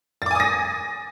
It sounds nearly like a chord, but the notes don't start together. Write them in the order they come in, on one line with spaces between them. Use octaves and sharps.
A6 D6 G#5 D#6 A#6